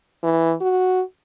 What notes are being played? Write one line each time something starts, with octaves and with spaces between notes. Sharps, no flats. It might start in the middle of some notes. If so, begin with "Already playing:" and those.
E3
F#4